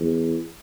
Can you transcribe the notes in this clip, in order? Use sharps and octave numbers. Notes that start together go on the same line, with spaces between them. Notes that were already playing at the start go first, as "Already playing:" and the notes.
Already playing: E2